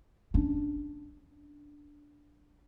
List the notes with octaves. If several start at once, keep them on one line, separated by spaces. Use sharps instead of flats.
C#4 D4